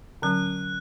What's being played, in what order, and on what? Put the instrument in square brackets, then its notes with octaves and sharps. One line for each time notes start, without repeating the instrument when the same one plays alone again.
[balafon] D3 F#3 C#4 [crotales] F#6